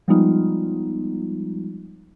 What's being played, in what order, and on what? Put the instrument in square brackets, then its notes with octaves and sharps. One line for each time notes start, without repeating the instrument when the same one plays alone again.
[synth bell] F3 G3 G#3 B3 D#4 F4